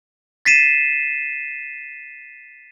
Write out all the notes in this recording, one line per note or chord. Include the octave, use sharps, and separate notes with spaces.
A6 B6 C7 D#7 E7